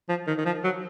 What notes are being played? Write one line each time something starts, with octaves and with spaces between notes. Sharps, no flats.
F3
D#3
D#3
F3
F#3